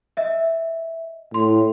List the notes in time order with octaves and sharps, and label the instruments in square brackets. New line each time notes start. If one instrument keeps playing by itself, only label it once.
[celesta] D#5 E5
[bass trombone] A2 [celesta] C6